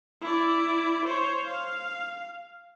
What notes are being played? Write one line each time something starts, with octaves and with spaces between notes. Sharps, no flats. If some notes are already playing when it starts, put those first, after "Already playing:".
E4 D5
C5 C#5
F5